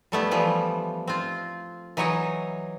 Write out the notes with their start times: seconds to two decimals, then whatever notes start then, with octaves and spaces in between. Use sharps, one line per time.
0.12 G3 A3 B3 E4
0.31 E3 F3 G3
1.08 C4 F4
1.97 E3 F#3 D#4 C#5 D#5